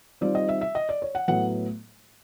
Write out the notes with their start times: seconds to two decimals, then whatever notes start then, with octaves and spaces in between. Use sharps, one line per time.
0.21 D#3 G3 C4 F4 D5
0.35 D#5
0.49 E5
0.61 E5
0.75 D#5
0.89 D5
1.02 C#5
1.15 F#5
1.28 A2 F#3 B3 F#5